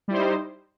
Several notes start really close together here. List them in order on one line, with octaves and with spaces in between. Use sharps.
G3 E4 C5 D#4